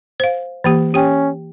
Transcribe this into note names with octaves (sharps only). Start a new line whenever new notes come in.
C5 F5
E3 A#3 G4
C#4 G4 G5